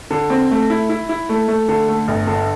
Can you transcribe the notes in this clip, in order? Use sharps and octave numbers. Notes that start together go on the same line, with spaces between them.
D3
C4
A3
E4
E4
E4
A3
A3
D3
A3
G1
D3